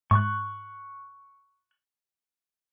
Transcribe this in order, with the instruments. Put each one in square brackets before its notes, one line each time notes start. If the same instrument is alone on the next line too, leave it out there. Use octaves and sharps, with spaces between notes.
[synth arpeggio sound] G#2 [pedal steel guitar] C#6 F#6